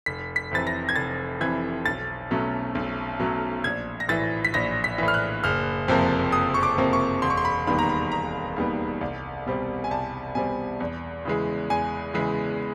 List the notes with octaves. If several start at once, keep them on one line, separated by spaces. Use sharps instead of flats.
F1 B6
B6
F2 C3 E3 A6
A#6
G#6
F1 A6
F2 C3 E3 G#6
B1 A6
B2 F#3 A3 C#4
B1
B2 F#3 A3 C#4
A#1 G#6
A#6
A2 E3 A6
B6
A#1 A#6
B6
A2 E3
F6
F#6
F#1 F6
F2 C3 F3 A#3
F#1 D#6
C#6
D6
F2 C3 F3 A#3
C#6
E1 C6
C#6
C6
B5
D#2 D#3 G3 B3 B5
A#5
B5
E1 A#5
D#2 D#3 G3 B3
C2
B2 G3 C4
G#5
C2 A5
B2 G3 C4 G#5
E2
C#3 E3 G#3
E2 G#5
C#3 E3 G#3